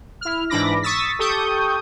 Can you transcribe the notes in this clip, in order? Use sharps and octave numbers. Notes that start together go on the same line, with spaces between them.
E4 F6
G#2 E3 D4 B5 D6 A#6
C#6 D#6 E6 A6 B6
G4 A4 C#6 D#6 G6